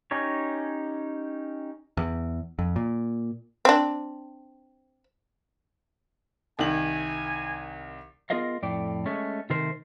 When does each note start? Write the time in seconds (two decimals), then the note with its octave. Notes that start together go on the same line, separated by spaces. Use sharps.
0.11 C#4 D#4 G4 C#5
1.97 E2
2.59 F2
2.76 A#2
3.65 C4 D4
6.59 C2 D#3 G#5 F#7
8.30 B3 F4 G#4 A#4 D#5 F5
8.62 F2 A2 D5 G5
9.06 G#3 A3 C#4
9.50 C3 D#3 A3 A#4 C5